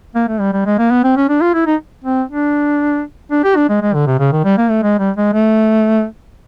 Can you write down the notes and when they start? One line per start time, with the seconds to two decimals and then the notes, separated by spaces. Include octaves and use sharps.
0.15 A#3
0.28 A3
0.40 G3
0.53 G3
0.66 G#3
0.78 A#3
0.91 B3
1.04 C4
1.17 C#4
1.29 D4
1.41 F4
1.54 E4
1.67 D#4
2.05 C4
2.30 D4
3.31 D4
3.44 G4
3.56 D4
3.69 G#3
3.82 G#3
3.94 D3
4.07 C3
4.19 C#3
4.32 D#3
4.45 G3
4.58 A#3
4.70 A3
4.83 G#3
4.99 G3
5.17 G#3
5.33 A3